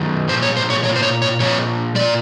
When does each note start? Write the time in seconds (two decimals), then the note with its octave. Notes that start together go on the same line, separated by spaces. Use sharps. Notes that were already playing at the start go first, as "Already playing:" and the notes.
Already playing: F#2 D#3
0.29 A#2 F3 C5
0.42 C#5
0.57 C5
0.70 C#5
0.84 F3 C#5
0.89 A#2
0.96 C5
1.03 C#5
1.22 C#5
1.40 A#2 F3 C#5
1.95 A#2 F3 D5